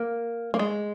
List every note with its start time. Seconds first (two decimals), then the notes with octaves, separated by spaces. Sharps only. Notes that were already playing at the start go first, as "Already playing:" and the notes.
Already playing: A#3
0.54 A#3
0.59 G#3